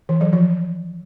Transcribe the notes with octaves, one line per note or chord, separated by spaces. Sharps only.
E3
F#3
F3